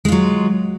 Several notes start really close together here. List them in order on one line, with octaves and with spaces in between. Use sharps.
G#3 F4 F#3